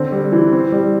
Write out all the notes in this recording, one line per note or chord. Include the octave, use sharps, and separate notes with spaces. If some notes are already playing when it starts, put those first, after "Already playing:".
Already playing: D3 C4
G3
E3
C4
G3